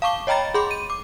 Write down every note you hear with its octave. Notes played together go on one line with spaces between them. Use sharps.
F5 A5 C#6 D6 G7
C#5 D#5 G5 A#5 B5 A6
G#4 B5 C6 D6
D#7
D6